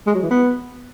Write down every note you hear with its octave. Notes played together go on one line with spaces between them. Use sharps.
G#3
F#3
E3
B3